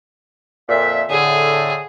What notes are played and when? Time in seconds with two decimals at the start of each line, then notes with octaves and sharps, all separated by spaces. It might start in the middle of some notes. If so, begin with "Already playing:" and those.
0.69 F2 A#2 E5
1.10 A2 D3 G#4